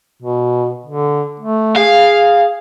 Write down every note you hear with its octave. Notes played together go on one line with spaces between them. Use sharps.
B2
D3
A3
G#4 F5